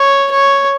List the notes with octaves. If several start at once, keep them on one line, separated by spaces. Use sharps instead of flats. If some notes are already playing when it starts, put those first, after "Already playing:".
Already playing: C#5
C#5